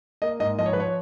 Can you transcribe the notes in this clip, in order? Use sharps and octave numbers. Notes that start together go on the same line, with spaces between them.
A#3 D#5
G#2 D#5
F3 D#5
C#5
B4
F3 C#5